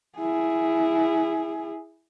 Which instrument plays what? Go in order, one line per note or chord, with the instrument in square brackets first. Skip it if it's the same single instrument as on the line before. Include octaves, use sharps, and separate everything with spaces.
[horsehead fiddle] E4 G#4